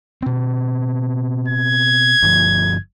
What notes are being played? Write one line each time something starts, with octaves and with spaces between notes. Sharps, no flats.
B2 C4
G#6
G1 F3